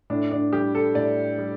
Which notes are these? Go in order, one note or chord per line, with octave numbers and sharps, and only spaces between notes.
A2 D4
D4
G3 G4
A4
A2 D5
G3